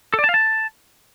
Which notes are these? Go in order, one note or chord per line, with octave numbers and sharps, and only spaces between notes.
A4
D5
A5
F5
A5